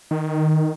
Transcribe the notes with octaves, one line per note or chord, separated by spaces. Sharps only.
D#3